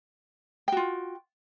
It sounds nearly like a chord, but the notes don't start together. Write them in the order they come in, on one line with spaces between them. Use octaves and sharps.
G5 F#4 F4